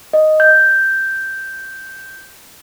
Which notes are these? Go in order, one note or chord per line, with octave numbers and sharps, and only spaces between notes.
D#5
G6